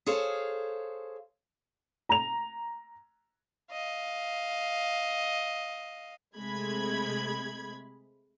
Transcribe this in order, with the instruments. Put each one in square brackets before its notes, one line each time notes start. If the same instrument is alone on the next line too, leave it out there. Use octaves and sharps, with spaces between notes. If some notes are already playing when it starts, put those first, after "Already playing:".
[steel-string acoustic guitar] G#4 A4 C5 C#5 F5
[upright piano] A#5 F7
[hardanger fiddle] D#5 F5
[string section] C3 G#3 A3 B5 G#6